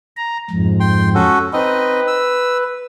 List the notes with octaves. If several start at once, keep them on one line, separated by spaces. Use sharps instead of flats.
A#5
F2 G#2
G5 C6
C#4 F#4 A4
C4 D#4 B4 D#5
E6